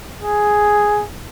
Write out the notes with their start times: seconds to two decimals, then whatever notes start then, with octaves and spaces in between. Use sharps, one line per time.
0.22 G#4